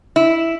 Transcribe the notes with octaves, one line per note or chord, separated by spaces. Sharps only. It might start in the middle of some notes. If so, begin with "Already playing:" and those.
E4